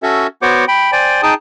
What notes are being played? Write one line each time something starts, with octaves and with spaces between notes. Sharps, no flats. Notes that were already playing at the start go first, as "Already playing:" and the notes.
C#4 F#4 A4 E5
B3 F#4 C5 C#5 F#5 D6
G5 B5
C5 D5 G5 G#5
D#4 G#4 G5 A5 D#6